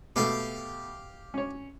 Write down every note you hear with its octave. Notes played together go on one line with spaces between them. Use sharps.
B2 A3 G4 F5
C#4 C#5